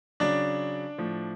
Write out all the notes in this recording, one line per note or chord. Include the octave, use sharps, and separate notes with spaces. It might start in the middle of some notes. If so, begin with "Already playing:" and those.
C#3 F#3 D4 D5
A2 F3